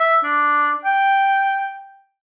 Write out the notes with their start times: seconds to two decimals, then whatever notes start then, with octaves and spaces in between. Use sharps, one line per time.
0.01 E5
0.24 D4
0.85 G5